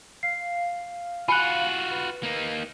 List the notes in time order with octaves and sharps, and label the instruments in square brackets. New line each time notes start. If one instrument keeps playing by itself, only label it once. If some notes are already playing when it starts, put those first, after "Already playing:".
[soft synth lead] F5 [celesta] C7
[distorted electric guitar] F4 F#4 [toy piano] G#5 B5 [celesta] F#6 C#7 D#7
[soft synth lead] B4
[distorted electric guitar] A#3 D#4